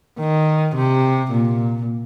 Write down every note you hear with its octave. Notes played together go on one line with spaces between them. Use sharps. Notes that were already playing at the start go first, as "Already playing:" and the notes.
D#3
C3
A#2